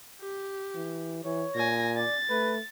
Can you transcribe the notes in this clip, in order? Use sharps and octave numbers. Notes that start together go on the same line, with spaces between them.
G4
E3
E3 C#5
A#2 G#5 A#6
D5 A6
A3 B4